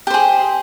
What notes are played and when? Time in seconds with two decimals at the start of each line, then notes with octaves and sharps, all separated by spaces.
0.07 G4
0.10 C5
0.14 G#4